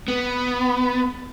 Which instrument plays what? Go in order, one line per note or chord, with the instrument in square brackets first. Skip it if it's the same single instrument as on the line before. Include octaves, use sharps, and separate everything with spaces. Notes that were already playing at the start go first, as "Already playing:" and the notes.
[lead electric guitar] B3